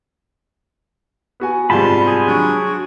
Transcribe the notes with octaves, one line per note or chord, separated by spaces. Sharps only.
B3 F#4 G#5
G#2 C3 G3 F4 A5 B5
G#4
F#3 D4 C#6
F#4